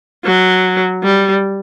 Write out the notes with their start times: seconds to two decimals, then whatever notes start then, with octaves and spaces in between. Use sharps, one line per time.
0.24 F#3
1.03 G3